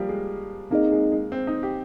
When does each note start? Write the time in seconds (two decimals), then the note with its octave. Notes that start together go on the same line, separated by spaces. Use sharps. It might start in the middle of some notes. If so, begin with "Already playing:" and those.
Already playing: F3 G3 A#3
0.09 G#3
0.71 A#3 C4 D#4 G#4 D#5
0.92 G#3
1.12 G#3
1.32 C4
1.47 D#4
1.63 G4